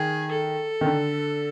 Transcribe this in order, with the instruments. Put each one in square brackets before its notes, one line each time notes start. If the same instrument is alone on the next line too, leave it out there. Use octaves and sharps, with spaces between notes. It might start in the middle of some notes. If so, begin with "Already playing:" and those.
Already playing: [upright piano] D#3 [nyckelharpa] G#4
[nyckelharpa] A4
[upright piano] D#3
D3